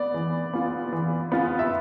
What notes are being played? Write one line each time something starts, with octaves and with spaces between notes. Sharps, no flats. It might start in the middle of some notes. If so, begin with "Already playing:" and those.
Already playing: B3 D5
E3
B3 F4
E3
B3 F4
E5